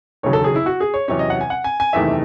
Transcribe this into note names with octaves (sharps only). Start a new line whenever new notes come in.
E1 D#2 C#3 F#3 C#5
A4
G#4
E4
F#4
G#4
C#5
E2 C3 F#3 C#4 C#5
D#5
F#5
G#5
F#5
G#5
G#5
F#1 E2 C3 D#3 A3 E5